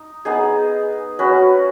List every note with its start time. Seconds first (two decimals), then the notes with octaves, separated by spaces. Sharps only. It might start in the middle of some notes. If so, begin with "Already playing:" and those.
Already playing: D#4
0.25 B3 D#4 G#4
1.19 C#4 F#4 B4